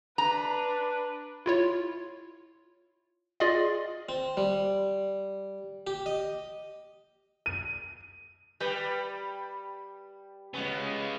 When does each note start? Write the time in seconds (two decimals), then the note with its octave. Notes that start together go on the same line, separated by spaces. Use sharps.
0.18 D4 B4 A#5
1.46 E4 F4 C#5
3.40 F4 G#4 D5 D#5
4.09 C4
4.37 G3
5.87 G4
6.06 D#5
7.46 D#7
8.60 G3 G4 B4
10.54 G#3 B3 C#4